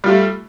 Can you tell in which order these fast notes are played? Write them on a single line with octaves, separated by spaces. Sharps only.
G3 F4 A3